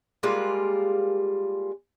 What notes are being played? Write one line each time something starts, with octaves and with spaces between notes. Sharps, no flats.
G3 G#3 A#3 F4